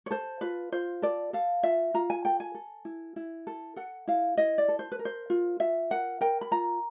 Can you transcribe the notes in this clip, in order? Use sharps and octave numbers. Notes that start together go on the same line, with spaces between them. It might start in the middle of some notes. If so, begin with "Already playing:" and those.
C#5
A4 C5
F4 B4
F4 C5
A4 D5
A4 F5
F4 E5
F4 A#5
G#5
A4 G5
G#5
A4
E4
E4
A4
A4 F#5
E4 F5
E4 D#5
D5
A4
C5
B4
A#4
C5
F4
F4 E5
A#4 F#5
A#4 G5
B5
F4 A#5